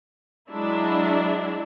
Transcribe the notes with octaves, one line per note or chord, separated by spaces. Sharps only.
F#3 G#3 D4 E4